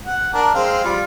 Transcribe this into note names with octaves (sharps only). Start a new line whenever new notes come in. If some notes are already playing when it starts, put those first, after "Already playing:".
F#5
D4 A#4
G#3 C4 F5
G3 F4